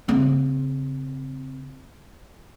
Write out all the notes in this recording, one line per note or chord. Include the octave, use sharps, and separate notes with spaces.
C#3 C4